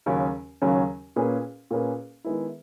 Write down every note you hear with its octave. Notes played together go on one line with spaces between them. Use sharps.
D#2 C#3 F#3 C#4
D#2 C#3 F#3 C#4
A#2 A#3 C#4 G#4 B4
A#2 A#3 C#4 G#4 B4
D#3 G#3 B3 E4